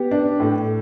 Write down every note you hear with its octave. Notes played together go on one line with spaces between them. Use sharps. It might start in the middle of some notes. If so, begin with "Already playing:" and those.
Already playing: B3 G4
D4
A2